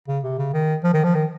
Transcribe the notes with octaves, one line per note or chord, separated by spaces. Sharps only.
C#3
C3
C#3
D#3
F3
D#3
F3
D#3